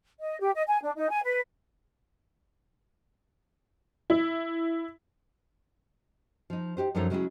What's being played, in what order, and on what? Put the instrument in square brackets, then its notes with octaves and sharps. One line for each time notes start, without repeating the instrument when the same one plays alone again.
[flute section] D#5
G4
D#5
G#5
D4
D#4
G#5
B4
[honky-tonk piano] E4
[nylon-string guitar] F3 D#4
D#4 F#4 G4 C5
F#2 F3 F#3 D#4 A4 C#5
C#3 F#3 G#3 B3 E4 G#4